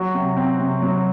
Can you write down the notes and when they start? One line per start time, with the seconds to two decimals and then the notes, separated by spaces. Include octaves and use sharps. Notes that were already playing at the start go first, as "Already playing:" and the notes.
Already playing: F#3 F#4
0.15 C3
0.37 C4
0.60 C3
0.82 F#3